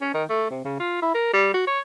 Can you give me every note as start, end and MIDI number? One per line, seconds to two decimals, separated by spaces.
0.01 0.10 61
0.14 0.24 51
0.29 0.49 57
0.50 0.64 48
0.64 0.77 49
0.80 1.00 65
1.02 1.14 64
1.14 1.33 70
1.33 1.51 55
1.54 1.64 66
1.67 1.80 73